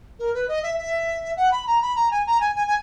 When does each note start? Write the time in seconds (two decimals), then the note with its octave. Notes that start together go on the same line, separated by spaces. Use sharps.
0.19 A#4
0.34 B4
0.48 D#5
0.63 E5
0.78 E5
1.36 F#5
1.51 B5
1.67 A#5
1.82 B5
1.96 A#5
2.11 G#5
2.26 A#5
2.40 G#5
2.55 G#5
2.67 G#5